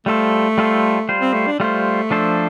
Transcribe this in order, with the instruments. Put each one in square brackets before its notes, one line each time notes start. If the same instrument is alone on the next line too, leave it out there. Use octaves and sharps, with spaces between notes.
[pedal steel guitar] G3 F4 A4 C5 [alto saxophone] A3
[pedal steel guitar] G3 F4 A4 C5
G3 F4 C5
[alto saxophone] C4
A3
D4
[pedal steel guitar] G3 F4 C5 [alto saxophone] A3
[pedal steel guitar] F3 D4 A4 C5